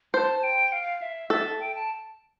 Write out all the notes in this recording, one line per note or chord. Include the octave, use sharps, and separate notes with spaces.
C5 A5
G5
F5
E5
A4 E5
G5
A5